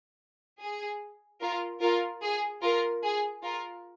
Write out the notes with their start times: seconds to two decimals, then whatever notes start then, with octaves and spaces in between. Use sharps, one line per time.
0.60 G#4
1.41 F4 A#4
1.81 F4 A#4
2.22 G#4
2.63 F4 A#4
3.03 G#4
3.44 F4 A#4